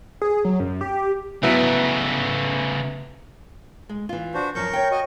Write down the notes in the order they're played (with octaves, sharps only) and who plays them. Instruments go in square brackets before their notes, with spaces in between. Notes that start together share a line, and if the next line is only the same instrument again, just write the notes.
[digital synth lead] G#4
F#3
F#2
G4
[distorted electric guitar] C#3 A3 [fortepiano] F#3 B3 E4
[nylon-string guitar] G#3
E3 F4
[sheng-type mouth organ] D4 F#4 C5
[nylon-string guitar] F#2 F3 [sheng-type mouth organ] A#4 C#6 G6
[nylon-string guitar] C#5 G5
[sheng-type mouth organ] F#4 D#5